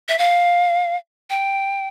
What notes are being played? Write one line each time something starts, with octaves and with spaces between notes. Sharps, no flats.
E5
F5
G5